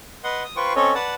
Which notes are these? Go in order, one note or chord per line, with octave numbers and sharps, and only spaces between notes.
B4 D#5 F#5 C6
D#6
F4 B4 C5 G5 C#6
C4 C#4 A4 C#5 D#5
B4 D5 F#5 A5